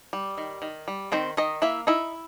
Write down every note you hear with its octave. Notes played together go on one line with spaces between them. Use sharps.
G3
D#3
D#3
G3
D#3 C4 C5
D#3 D#4 D#5
A#3 E4 E5
D#4 E4 E5